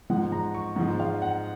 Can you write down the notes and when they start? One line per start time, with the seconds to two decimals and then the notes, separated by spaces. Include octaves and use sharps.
0.10 G#2 F3 G#3 F#5
0.32 A#5
0.54 C#6
0.76 G#2 F3 G#3 F#5
1.00 F5
1.22 F#5